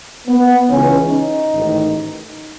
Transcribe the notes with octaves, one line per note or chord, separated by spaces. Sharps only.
B3
C#2 C#3 E3 C#4
D#4
A1 G#2 D#3